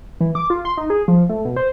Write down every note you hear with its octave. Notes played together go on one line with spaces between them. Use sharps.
E3
D6
F4
C6
D#4
G#4
F3
A3
B2
C5